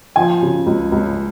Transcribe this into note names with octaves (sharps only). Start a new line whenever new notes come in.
F3 G#5
C#3
C#2
C#2